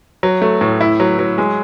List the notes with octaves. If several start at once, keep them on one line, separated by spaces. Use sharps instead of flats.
F#3
A3
A2
E4
F#3
F#3
G#3